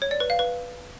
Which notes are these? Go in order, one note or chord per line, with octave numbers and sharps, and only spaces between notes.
C#5
D5
B4
F5
B4